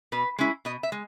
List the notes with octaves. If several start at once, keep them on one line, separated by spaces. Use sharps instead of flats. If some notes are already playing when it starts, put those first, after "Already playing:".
B2 B4
G#3 C#4 E4
B2 D#5
E5
G#3